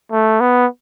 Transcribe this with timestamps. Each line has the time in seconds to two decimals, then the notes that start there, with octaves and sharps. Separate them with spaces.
0.11 A3
0.40 B3